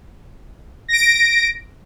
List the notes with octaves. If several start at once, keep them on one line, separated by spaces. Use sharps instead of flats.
A#6 D7